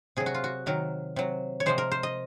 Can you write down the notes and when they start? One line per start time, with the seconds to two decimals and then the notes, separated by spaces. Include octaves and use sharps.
0.17 C3 F#3 G#4
0.26 F#4
0.34 F4
0.44 F#4
0.66 C3 D#3 F#3 A#4
1.16 C3 F#3
1.60 C#5
1.66 C3 F3 G#3 C5
1.78 A#4
1.91 C5
2.03 D#5